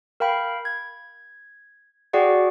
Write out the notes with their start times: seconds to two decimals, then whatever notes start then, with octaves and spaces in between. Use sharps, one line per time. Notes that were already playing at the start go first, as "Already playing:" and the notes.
0.20 A#4 F5 G5 B5
0.65 G#6
2.13 F#4 G#4 D5 F#5 G5